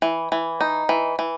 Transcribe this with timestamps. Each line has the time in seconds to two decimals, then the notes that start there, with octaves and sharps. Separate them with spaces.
0.02 E3
0.32 E3
0.61 D#4
0.89 E3
1.19 E3